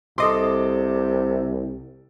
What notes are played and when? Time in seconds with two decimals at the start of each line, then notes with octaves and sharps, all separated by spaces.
0.18 C2 C3 A4 D#5 C6 D6